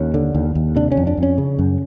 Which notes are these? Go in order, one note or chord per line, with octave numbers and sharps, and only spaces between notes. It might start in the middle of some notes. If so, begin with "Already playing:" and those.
Already playing: D#2 C#4
D3
D#2
D#2
C3 D4
C#4
F2
D4
F2
C#4
C#3
F#2